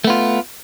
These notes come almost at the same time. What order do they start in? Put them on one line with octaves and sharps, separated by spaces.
A3 B3 F4